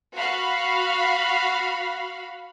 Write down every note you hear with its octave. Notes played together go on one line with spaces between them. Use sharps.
F#4 F5 B5